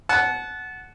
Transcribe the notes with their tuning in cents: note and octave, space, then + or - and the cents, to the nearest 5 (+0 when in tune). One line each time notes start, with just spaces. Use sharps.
F#5 +0 A5 -30